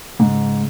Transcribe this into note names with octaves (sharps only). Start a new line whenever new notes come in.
G#2 C#3